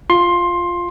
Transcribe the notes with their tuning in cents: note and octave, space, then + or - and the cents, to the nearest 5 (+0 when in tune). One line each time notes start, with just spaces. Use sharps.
F4 +0 C6 +15